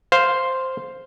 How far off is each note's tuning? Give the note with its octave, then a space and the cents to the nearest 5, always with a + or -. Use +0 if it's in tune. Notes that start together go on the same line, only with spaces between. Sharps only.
C5 +0 F5 +0